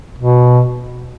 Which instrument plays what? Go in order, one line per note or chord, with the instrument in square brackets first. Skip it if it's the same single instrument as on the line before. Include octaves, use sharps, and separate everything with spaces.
[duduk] B2